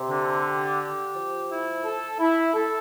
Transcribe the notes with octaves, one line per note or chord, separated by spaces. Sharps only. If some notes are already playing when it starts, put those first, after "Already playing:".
Already playing: C3
D3
G4
G4
F3
E4
A4
E4
A4